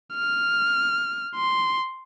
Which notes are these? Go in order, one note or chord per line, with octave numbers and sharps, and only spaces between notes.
F6
C6